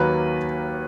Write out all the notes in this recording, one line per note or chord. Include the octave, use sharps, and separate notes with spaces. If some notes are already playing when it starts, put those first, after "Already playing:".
Already playing: D#2 D#3 F#3 A#3 B4